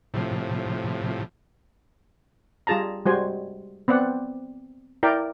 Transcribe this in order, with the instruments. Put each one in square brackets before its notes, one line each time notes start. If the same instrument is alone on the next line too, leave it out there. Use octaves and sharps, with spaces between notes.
[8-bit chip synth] A2 C3 F3
[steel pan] G3 F4 G#4 A5 A#5
G3 G#3 F#4 C5 G#5
B3 C4 D5 F#5
E4 A#4 D5 G5